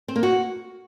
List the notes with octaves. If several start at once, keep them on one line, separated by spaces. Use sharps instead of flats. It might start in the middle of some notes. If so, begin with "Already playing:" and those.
C4
A#3
F#4